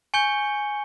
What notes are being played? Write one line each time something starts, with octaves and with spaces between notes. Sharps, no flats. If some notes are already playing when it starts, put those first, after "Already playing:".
G#5 C#6 G6 C#7 G7